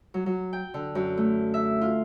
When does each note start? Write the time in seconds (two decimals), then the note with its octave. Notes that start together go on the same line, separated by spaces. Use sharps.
0.14 F#3
0.26 F#3
0.53 G5
0.74 D3
0.95 F#2
1.17 A3
1.54 E5
1.81 F4